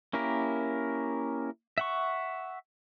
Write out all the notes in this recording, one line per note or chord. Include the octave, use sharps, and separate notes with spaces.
A#3 C#4 E4 G4 A#4
E5 F#5 C#6